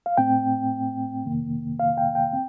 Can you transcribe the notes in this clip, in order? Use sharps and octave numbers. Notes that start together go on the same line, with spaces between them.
F5
A2 A3 C4 G5
F2 C3 D#3 A#3
F5
G5
G5
C4